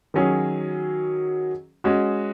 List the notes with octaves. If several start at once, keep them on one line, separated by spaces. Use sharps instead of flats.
D#3 F#3 C#4 G#4
G#3 C#4 F#4